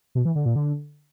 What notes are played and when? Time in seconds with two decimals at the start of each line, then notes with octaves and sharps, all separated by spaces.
0.15 B2
0.25 E3
0.35 D3
0.46 A#2
0.56 D3